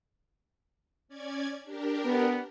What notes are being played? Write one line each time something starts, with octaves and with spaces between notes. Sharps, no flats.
C#4 D5 G#6
D4 G4 A#4
B3